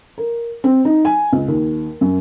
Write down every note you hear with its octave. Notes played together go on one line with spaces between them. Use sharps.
A#4
C4
D#4
G#5
C#2
D#2
F#2